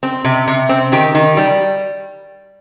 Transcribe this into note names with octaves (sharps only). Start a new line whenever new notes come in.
C4
C3
C3
C4
D#3 G4
D#3
G3